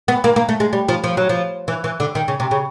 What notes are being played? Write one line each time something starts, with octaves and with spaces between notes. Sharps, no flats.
B3
A#3
A#3
A3
G#3
G3
F3
F3
F#3
F3
E3
E3
D3
D#3
C#3
C3
C#3